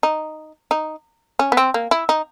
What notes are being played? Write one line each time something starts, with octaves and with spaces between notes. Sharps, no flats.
D#4
D#4
C#4
B3
C4
A#3
E4
D#4